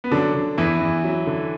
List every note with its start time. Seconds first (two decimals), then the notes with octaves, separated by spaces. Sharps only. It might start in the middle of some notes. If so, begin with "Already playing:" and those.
0.04 B3
0.11 D3 F#3 D4
0.35 D3
0.58 E2 E3 E4
0.81 E2
1.04 F#3
1.27 D3